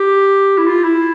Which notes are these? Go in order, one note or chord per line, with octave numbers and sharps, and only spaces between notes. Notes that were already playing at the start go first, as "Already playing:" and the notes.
Already playing: G4
E4
F4
E4